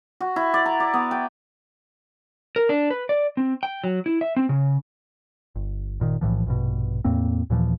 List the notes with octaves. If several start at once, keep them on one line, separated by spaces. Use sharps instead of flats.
F#4
E4
D5
A#5
D5
B3
G5
A#4
D4
B4
D5
C4
G5
F#3
E4
E5
C4
C#3
G1
G1 A#2 D#3
B1 A2 E3 F3
A#1 G2 B2
E2 A2 A#3 C4
D#2 A#2 E3 F3